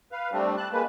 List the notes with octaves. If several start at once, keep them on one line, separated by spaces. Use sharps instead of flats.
B4 F5
G3 A3 C4 D4
A5 F#6
G#3 A#3 B4